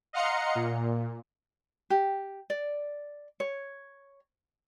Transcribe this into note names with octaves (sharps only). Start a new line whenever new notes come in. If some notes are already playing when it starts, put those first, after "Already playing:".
D#5 F5 F#5 A#5 C6 C#7
A#2
G4
D5
C#5